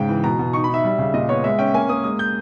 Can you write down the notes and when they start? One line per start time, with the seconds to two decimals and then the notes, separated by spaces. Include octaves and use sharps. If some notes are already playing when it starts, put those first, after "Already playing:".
Already playing: G#2 C#3 G5
0.09 E3
0.24 B2 A#5
0.39 B2
0.53 D#4 C#6
0.64 B5
0.68 D#4
0.74 E5
0.84 G3
0.99 C#3
1.14 A#2 D#5
1.29 B3 C#5
1.44 G#3 E5
1.59 C#4 G5
1.74 A#3 G#5
1.89 A#3 D#6
2.04 G#3 D#6
2.19 G6